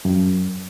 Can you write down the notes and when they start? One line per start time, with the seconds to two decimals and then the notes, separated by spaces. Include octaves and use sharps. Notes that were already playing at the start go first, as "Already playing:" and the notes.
0.05 F#2